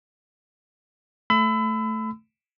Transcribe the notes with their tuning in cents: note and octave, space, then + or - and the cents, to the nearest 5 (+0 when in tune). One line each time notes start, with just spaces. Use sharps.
A3 +0 B5 +35 E6 +0